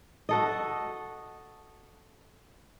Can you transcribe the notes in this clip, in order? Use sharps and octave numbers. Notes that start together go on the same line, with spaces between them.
F#4 A4 D#5